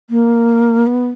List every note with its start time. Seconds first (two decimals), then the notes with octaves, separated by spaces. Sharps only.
0.10 A#3
0.87 B3